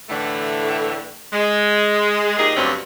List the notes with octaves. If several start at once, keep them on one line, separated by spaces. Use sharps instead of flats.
A2 D3 E3 A3
G#3
A#2 D#4 G4 G#4
D2 G2 F#3 C4 C#4